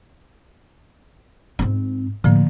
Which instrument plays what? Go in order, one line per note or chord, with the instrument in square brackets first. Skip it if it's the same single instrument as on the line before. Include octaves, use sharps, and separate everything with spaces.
[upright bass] G#2 C4
[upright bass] A2 [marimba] D3 F3 A#3